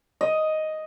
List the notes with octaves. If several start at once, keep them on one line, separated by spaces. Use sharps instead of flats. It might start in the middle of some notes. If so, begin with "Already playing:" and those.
D#5